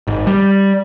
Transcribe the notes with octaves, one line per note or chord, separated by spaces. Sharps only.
G#1
G3